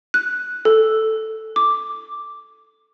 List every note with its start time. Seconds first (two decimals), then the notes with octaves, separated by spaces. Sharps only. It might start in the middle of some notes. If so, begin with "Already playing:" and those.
0.14 F#6
0.65 A4
1.56 D6